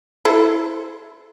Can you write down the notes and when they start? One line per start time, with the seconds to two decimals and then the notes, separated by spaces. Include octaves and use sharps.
0.25 E4 A4 C5